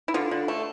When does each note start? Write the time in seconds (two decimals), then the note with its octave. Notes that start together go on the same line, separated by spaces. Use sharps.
0.08 E4
0.14 D3 F4
0.31 D3
0.48 A3